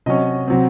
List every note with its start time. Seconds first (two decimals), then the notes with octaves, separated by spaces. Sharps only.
0.06 C3 F#3 C#4 D#5
0.48 C3 F#3 C4